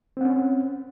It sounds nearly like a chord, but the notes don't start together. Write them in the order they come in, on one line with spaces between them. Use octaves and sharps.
C4 F#5 C#4